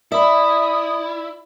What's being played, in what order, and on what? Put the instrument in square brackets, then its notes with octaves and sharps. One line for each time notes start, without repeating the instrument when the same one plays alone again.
[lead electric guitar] E4 [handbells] D5 B5 [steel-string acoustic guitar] E5 [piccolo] D#6